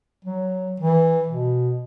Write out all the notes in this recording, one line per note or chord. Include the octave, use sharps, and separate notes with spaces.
F#3
E3
B2